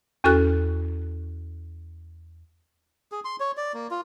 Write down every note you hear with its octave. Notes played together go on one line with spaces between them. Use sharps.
E2 C#4 F#4 A4 F6 F#6
G#4
C6
C#5
D5
A#3
F4